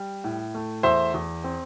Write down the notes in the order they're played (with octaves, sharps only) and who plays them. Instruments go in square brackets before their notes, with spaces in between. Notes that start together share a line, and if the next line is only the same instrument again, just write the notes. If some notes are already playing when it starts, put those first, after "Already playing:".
Already playing: [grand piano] G3
A2
A3
E2 C5 E5
E2
C4